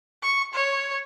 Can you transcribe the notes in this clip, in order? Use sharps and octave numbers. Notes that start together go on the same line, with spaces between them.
C#6
C#5